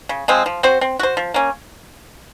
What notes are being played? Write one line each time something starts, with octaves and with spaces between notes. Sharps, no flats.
C#3
F3 G#3 C4
F3
C4 F#4 C5
C4
F#4 C5
F3
A#3 C#4